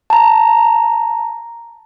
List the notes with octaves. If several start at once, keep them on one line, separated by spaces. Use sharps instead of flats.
A5 A#5